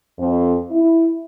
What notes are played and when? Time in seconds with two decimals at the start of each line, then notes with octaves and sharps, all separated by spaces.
0.19 F2
0.71 E4